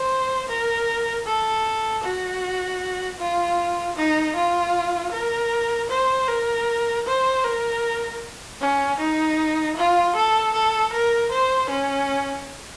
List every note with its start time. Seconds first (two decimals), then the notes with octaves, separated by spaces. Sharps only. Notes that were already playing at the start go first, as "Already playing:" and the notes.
Already playing: C5
0.48 A#4
1.26 A4
2.04 F#4
3.19 F4
3.97 D#4
4.36 F4
5.12 A#4
5.90 C5
6.28 A#4
7.06 C5
7.44 A#4
8.61 C#4
8.99 D#4
9.77 F4
10.16 A4
10.53 A4
10.93 A#4
11.31 C5
11.69 C#4